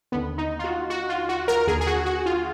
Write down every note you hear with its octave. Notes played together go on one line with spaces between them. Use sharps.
D#2 D3 B3
D#4
F4
F#4
F#4
F4
F#4
A#4
D#2 D3 G#4
G#4
F#4
F#4
F4